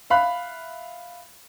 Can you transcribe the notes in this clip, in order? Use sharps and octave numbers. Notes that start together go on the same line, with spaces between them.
E5 F5 B5 F#6